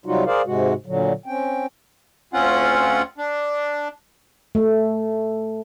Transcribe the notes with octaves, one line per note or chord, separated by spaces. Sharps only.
C3 F#3 G3 D#4 F4 F#4
G#4 A#4 C5 D5 F5
G#2 C3 G#3 F#4
A#2 D3 F#3
C4 C#4 G5
D2 C4 C#4 F4 F#5
D4
A3